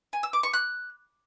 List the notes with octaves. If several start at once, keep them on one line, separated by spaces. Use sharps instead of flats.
G#5
E6
D6
C#6
F#6